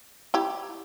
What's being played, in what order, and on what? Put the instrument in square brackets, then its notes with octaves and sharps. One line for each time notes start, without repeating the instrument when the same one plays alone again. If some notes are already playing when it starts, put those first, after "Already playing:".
[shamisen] E4 G4